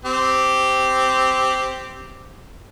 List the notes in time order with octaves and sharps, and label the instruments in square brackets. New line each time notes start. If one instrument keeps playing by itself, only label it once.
[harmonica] C4 G4